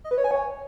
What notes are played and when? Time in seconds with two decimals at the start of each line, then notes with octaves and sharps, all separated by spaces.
0.04 D#5
0.11 B4
0.18 C#5
0.24 G#5
0.31 C#5